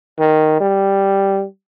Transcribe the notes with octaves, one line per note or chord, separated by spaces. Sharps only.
D#3
G3